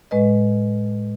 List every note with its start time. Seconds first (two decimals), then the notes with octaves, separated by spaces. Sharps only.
0.11 A2 G#3 B4 D#5